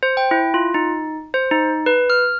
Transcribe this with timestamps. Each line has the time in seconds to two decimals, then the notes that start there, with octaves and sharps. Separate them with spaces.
0.03 C5
0.17 G5
0.31 E4
0.54 F4
0.74 D#4
1.34 C5
1.51 D#4
1.86 B4
2.10 F6